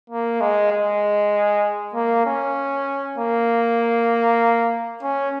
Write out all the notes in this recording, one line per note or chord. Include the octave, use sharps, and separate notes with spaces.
A#3
G#3
G#3
A#3
C#4
A#3
C#4